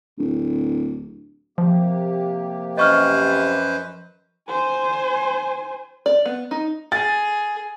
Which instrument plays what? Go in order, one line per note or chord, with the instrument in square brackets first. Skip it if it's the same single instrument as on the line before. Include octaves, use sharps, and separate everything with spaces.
[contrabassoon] D1
[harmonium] C3 A#3 G4 [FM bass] F3
[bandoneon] F#2 B4 C5 [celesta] D#5 C#6 F6
[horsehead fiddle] C5 G#5
[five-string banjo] D5
B3
D#4
[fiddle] G#4 [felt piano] A6